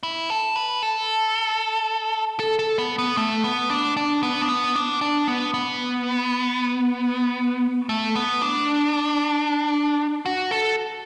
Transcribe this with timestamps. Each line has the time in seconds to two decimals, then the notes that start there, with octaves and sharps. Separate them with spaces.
0.03 E4
0.30 A4
0.56 B4
0.82 A4
2.39 A4
2.59 A4
2.78 B3
2.99 B3
3.17 A3
3.44 B3
3.70 D4
3.97 D4
4.23 B3
4.42 D4
4.49 B3
4.75 D4
5.01 D4
5.28 B3
5.54 B3
7.89 A3
8.15 B3
8.42 D4
10.26 F#4
10.51 A4